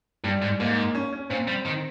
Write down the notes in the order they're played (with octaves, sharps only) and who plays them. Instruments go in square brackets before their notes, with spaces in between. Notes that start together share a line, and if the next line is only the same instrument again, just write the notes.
[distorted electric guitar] G2 [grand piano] G3
[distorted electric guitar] G#2
[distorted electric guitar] G#2 [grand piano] A#3
[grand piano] C#4
C#4
[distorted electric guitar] A#2 [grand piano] C4
[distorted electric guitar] G3
D#3